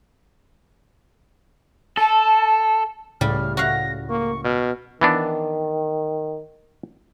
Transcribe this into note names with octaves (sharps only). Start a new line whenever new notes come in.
A4 A5
C#2 A2 C#3 G3 F6
F#4 F5 A#6
A#3 C#6
B2 F6
D#3 E3 B3 D4